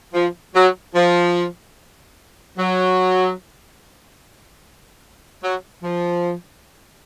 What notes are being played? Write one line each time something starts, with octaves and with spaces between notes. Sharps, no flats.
F3
F#3
F3
F#3
F#3
F3